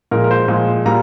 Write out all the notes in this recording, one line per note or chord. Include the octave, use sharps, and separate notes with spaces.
A#2 F3 G#3 A#4
A#4
C5
A#2 F3 G#3
A#2 G3 A#3 A#5